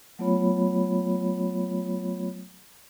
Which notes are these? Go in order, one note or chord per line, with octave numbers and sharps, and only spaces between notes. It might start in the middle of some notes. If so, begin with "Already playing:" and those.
F#3 A3 B3 F4 C#5 B5